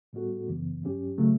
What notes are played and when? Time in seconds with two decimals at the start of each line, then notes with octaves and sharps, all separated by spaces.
0.13 A2 G3 B3 F#4 A4
0.48 F#2 C#3 E3 B3
0.83 G2 F#3 C#4 G4
1.18 C#3 F#3 A3